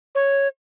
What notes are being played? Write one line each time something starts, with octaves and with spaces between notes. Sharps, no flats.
C#5